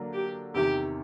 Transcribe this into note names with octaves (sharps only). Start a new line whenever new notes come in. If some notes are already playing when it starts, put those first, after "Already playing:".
Already playing: D3 F#3 A#3 D4
G4
E2 C3 D#3 G4